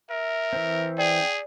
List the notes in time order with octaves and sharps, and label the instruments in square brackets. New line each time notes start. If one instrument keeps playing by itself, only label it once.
[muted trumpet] A#4 [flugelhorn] E5
[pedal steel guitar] E3 C4
[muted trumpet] G#4 [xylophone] D5 [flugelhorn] G5